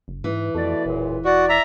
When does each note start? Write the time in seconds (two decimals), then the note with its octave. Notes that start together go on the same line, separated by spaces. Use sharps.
0.08 F#1
0.24 G#2 E3
0.55 F2 B2 A3 D5
0.85 E1 C#2 F#2 A#2
1.25 F#4 D5
1.49 E5 A#5